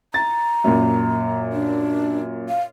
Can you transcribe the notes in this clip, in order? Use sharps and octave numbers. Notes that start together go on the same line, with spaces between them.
A#5 A6
F#2 A#2
D4
F5